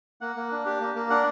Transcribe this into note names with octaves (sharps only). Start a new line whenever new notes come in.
A#3 F#5
A#3
D4
G4
A#3
A#3
D4 F#5